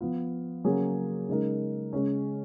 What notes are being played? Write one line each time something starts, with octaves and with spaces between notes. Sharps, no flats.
F3 B3 F4
C#3 F#3 A#3 C#4 G#4
C#3 G#3 D#4 A#4
C#3 G#3 C#4